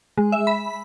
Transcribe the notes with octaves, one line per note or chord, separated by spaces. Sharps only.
G#3
E5
B5